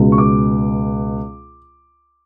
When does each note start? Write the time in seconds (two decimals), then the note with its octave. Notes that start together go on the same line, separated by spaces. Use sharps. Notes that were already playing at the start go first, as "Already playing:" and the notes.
Already playing: C#2 B2 G#3
0.12 C#6
0.18 D6